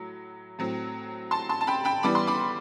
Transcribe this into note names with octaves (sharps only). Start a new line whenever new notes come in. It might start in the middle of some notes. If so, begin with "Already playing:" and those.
Already playing: A2 F#3
A2 F#3 C4
A5 C6
A5 C6
A5
G5 B5
G5 B5
E3 G3 B3 B5 D6
C6
B5 D6